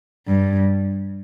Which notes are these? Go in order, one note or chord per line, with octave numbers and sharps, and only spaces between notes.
G2